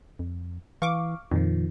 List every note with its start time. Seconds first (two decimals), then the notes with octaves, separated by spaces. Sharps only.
0.19 F2
0.82 E3 F5 C#6 D6
1.31 F2 A#2 D#3 F3